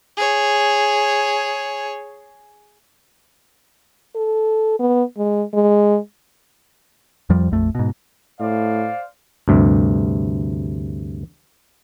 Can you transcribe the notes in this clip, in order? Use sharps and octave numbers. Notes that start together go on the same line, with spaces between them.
G#4 C#5
A4
B3
G#3
G#3
F2 F3 G3
A#1 F2 A3
G#2 B2
A2 C5 D5 F5
D2 G2 C3